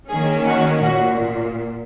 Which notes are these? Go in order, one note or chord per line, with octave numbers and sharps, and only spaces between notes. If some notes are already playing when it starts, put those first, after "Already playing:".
D#3 A#3 C#4 G#4
F#4
A#2 F#4